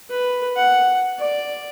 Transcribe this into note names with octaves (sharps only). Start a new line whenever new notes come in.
B4
F#5
D5